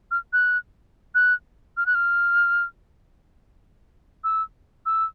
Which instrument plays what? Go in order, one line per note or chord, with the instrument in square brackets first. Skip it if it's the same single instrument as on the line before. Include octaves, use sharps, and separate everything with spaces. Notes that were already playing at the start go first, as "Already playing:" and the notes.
[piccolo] F6
F#6
F#6
F6
F#6
F6
E6
E6